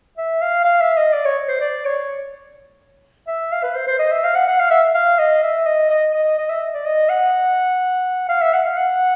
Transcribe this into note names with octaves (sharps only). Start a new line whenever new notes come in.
E5
F5
F5
E5
D#5
D5
C#5
C5
D5
C#5
E5
F5
B4
C5
C5
D#5
E5
F5
F#5
F#5
F5
E5
F5
D#5
E5
D#5
D#5
D#5
D#5
E5
D5
D#5
F#5
F5
E5
F#5
F5
F#5